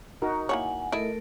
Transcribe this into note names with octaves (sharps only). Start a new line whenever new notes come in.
D#4 F#4 A#4
A#3 E4 C#5 F#5 G#5
A3 E4 A4 A#4 D#5